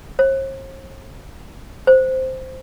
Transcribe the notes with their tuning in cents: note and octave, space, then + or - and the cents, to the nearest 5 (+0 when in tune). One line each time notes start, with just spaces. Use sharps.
C5 +45
C5 -5